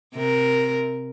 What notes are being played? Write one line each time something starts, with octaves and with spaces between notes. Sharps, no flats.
C3 A#4